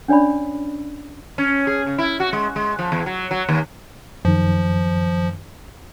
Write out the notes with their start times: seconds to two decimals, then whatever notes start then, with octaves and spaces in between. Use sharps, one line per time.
0.08 C#4 D4 C#5 D5 B5
1.38 C#4
1.67 G#4
1.87 C#3
1.98 E4
2.20 F#4
2.33 G#3
2.56 G#3
2.79 F3
2.92 E2
3.06 F#3
3.31 F#3
3.49 D#2
4.25 F#2 D#3 F3